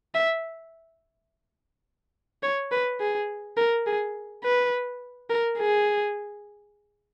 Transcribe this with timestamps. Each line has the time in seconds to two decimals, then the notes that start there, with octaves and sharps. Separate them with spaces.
0.15 E5
2.43 C#5
2.72 B4
3.00 G#4
3.57 A#4
3.87 G#4
4.44 B4
5.30 A#4
5.58 G#4